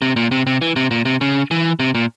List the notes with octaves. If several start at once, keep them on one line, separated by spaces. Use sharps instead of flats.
C3
A#2
C3
C3
E3
C3
A#2
C3
C#3
E3
C3
A#2